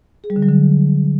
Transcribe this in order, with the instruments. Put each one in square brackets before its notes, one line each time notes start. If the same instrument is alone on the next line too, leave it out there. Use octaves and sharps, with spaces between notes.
[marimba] G#4
G3
D3
F#3
D3